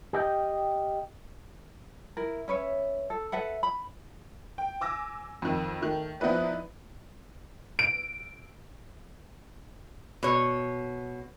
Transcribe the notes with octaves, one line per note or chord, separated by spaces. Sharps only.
G4 D#5 G5
E4 A#4
C#4 B4 C#5 E5
A4
A4 B4 E5 F#5
B5
G5
G#5 D6 E6 A#6
F2 D#3
D#3 A3
F3 B3 D#4 E4 B4 D5
D7
B2 C#5